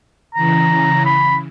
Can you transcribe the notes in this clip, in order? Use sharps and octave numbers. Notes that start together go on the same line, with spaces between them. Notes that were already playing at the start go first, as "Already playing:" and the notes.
C#3 E3 A#5
B5